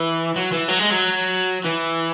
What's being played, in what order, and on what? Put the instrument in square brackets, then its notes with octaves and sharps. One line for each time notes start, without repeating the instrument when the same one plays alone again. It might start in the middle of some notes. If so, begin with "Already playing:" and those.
Already playing: [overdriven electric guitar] E3
F#3
E3
F#3
G#3
F#3
E3